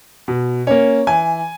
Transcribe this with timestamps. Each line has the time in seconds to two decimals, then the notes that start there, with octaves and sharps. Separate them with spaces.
0.28 B2
0.67 A#3 C#4 C#5
1.07 E3 G#5